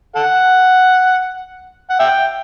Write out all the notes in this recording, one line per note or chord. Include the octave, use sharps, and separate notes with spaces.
A4 F#5
F#5
E5 G5